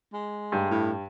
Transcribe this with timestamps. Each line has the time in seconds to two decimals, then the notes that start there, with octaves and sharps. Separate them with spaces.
0.14 G#3
0.52 G2
0.71 A2